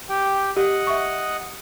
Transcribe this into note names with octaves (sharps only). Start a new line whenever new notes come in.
G4 G5
G4 D#5 F#5
E5 C#6